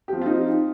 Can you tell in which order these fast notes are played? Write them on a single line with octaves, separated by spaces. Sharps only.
G4 F3 C4 F4 D#4